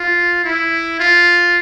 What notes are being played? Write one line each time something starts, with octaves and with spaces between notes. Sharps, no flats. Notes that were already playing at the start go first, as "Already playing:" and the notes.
Already playing: F4
E4
F4